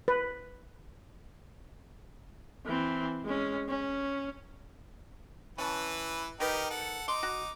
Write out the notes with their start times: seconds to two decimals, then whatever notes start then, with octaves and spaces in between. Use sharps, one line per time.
0.08 B4
2.66 E3 C4
3.24 G#3 C#4
3.68 C#4
5.58 E3 C#4 B4 A5
6.40 D#3 D#4 G4 A#4 B4
6.70 A4 F#5
7.08 D#4 C6 D6
7.23 F#4